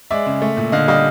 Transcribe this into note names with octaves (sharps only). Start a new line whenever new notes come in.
G#3 D5 E5
C#3
A3
A#2
D3 D#5 F5
G3 D#5 F5